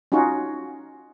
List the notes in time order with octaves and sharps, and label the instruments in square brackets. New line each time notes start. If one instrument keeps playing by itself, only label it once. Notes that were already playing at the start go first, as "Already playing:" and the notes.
[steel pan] C#4 D#4 F4 F#4